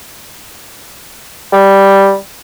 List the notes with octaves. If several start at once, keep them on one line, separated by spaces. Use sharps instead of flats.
G3